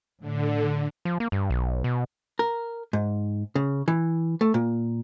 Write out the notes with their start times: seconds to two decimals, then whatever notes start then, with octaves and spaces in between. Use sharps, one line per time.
0.20 A2 D3
1.05 F3
1.20 A#3
1.32 G2
1.50 B1
1.84 B2
2.39 A#4
2.93 G#2
3.55 C#3
3.88 E3
4.41 A3
4.54 A#2